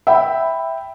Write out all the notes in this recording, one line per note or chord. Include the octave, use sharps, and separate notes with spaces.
E5 G5 B5